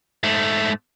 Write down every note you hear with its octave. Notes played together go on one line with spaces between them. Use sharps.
G#2 A3